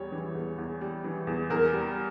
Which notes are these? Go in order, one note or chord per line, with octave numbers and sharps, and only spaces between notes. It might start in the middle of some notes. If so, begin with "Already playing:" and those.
Already playing: E2 G3 C#5
E3
E2
E2
G3
E3
E2
E2 A#4
G3